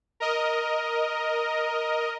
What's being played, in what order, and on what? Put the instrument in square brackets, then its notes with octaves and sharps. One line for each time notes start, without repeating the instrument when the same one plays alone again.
[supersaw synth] A#4 D#5